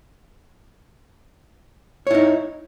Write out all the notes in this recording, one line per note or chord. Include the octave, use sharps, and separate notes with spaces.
D#4 E4 C#5